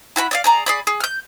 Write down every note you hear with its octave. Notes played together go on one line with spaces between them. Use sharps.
E4 F#4 A5 B5
D5 D#5 F5
G#4 D5 A#5
G#4 D5 B5
G#4
F6 G6